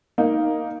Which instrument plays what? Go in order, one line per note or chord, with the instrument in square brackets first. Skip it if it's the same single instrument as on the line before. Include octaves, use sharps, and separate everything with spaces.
[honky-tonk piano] A#3 D#4